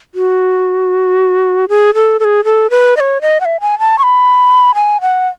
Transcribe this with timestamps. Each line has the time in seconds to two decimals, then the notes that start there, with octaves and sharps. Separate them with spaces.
0.15 F#4
1.69 G#4
1.95 A4
2.20 A4
2.24 G#4
2.45 A4
2.70 B4
2.97 D#5
3.00 C#5
3.22 D#5
3.40 F#5
3.45 E5
3.61 G#5
3.79 A5
3.99 C#6
4.03 B5
4.75 G#5
5.01 F#5